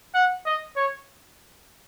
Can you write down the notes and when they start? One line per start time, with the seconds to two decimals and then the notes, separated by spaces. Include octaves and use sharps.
0.15 F#5
0.46 D#5
0.76 C#5